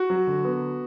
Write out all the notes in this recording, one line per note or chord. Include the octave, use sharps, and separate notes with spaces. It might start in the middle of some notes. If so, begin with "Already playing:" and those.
Already playing: F#4
F#3
D3
B3